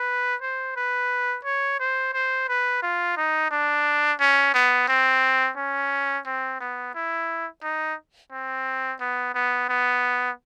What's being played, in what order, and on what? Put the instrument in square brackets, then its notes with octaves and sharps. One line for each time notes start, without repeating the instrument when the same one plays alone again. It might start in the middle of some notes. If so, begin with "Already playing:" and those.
Already playing: [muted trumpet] B4
C5
B4
C#5
C5
C5
B4
F4
D#4
D4
C#4
B3
C4
C#4
C4
B3
E4
D#4
C4
B3
B3
B3